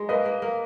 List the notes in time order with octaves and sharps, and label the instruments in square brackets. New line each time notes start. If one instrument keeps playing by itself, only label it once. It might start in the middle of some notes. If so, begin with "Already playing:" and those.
Already playing: [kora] G#3 D#4
[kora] A#3 [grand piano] B4 D#5
[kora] A#3
A#3